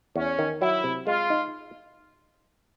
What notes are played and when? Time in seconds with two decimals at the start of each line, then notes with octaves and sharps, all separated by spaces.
0.16 E2 C#4
0.39 D#3
0.62 F#3 E4
0.84 C3
1.07 G#3 F4
1.30 D#4